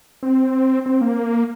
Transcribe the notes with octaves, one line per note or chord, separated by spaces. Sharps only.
C4
C4
A#3